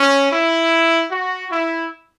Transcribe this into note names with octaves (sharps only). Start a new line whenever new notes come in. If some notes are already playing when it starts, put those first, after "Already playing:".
Already playing: C#4
E4
F#4
E4